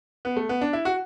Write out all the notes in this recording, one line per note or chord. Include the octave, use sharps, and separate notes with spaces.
B3
A3
B3
D4
E4
F#4